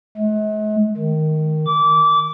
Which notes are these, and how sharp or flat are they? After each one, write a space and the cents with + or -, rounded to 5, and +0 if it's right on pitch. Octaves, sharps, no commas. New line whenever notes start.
G#3 +45
D#3 -5
D6 -20